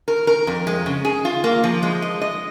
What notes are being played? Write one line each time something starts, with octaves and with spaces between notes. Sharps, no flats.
A#4
A#4
F2
G#3
C#3
G#4
F4
A#3
F3
G#3
D#5
D#5